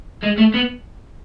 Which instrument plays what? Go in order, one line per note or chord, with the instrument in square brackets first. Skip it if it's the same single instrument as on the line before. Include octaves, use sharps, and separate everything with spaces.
[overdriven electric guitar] G#3
A3
B3